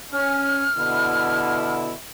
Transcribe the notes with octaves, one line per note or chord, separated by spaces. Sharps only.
C#4 F6
B2 D3 E4